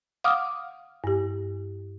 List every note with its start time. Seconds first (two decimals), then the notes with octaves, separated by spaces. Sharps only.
0.24 F5 F#5 D6 D#6 F6
1.04 G2 G4